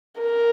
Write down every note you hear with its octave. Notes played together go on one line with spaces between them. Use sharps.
A#4